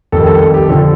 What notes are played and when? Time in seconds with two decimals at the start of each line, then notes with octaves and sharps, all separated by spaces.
0.12 F2 D#3 G3 A4
0.26 A4
0.40 A4
0.54 G4
0.68 D3 F3 A4